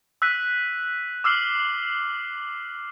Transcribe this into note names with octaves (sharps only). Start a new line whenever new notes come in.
E6 F#6 B6 D#7
D6 E6 F6 C7 F#7